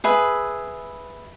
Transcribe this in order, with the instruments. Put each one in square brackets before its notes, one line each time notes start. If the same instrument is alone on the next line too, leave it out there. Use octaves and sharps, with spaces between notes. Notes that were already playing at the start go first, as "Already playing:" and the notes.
[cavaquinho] G#4 B4 E5 G#5